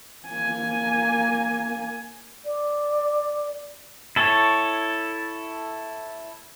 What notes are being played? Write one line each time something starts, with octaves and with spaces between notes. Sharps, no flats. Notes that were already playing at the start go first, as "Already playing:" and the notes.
A#3 G#5
D5
E4 A4 C#5